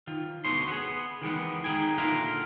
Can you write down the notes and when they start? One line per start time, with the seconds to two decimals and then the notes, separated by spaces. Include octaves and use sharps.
0.07 D#3 F4
0.45 D2 B2 C#5 D#5 C6
0.68 B3 G#4
1.22 D#3 E3 G#3 B3
1.64 D#3 D#4 G#4 G5 G#5
1.98 A#2 D3 E4 F4 A#4 F5